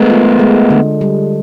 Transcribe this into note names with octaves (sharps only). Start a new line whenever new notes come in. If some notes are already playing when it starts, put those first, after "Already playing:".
Already playing: G#3 A3 B3
F4
G#3
D3
G3